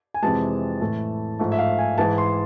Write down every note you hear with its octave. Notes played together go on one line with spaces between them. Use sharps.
G#5
F2 C3 E3 G#3 A5
A2 E3 A3
G#2 F3 A3
E5
F5
G#5
G#2 E3 G#3 A5
C6